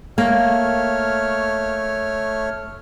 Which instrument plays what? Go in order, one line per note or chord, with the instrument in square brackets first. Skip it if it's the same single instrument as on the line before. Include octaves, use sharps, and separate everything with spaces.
[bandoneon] A3 C#5 F6 [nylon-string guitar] A#3